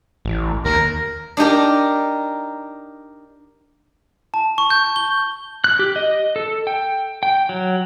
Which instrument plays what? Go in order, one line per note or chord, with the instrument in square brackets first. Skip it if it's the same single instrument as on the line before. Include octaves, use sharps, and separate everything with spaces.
[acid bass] A1
[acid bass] D#2 [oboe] A#4
[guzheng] D4 D#4 G4 A#4
[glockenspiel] A5
C#6
G6
G7
[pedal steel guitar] F#6
G4
D#5
A4
G5
G5
F#3